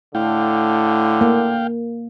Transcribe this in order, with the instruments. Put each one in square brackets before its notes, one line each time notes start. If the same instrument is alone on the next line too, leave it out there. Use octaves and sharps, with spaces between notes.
[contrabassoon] A2 [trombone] D3 [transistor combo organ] F5 G5
[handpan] A#3